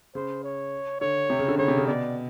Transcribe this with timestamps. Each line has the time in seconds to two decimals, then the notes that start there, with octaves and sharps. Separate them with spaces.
0.15 C#3 C5
0.44 C#5
1.00 D3 C#5
1.30 C3
1.39 C#3
1.48 D3
1.58 C#3 C#5
1.68 C3
1.77 C#3
1.87 B2 D5